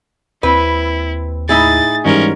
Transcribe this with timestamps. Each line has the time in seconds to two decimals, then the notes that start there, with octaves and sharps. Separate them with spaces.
0.43 D#2 C4 E4 B4
1.49 A2 D#4 E4 G#4 A6
2.05 G#2 E3 G3 C#4 A#4